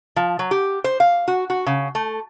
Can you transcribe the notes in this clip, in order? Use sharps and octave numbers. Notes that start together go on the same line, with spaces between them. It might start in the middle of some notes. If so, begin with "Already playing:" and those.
F3
F#3
G4
C5
F5
F#4
F#4
C#3
A3